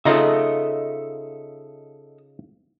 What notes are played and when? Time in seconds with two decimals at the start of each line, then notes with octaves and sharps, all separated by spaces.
0.05 C#3 D#4 F4 A4 D#5 E5